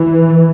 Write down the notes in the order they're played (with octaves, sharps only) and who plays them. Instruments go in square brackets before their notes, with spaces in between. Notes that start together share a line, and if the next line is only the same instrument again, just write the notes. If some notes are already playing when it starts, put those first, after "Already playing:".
Already playing: [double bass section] E3